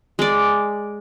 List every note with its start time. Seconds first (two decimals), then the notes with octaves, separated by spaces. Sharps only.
0.19 G#3 D5